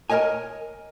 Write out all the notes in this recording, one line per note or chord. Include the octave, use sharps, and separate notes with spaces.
A#4 C5 C#5 D#5 G#5